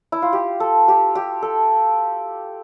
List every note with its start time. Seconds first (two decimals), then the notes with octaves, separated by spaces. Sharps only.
0.12 E4
0.22 F4
0.33 G4
0.60 A4
0.88 G4
1.15 G4
1.42 A4